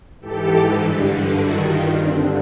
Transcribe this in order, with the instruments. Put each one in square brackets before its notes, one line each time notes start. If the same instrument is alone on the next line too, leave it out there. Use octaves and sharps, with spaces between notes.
[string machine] G#2 E3 G4 A4
G2 D3
G2 D#3 E4 F#4
D#4 F4
G2 C4 D4
D3